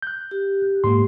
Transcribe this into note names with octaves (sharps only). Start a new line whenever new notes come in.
F#6 G6
G4
G#2 A#3 C6